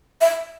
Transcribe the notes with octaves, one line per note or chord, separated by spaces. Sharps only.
E5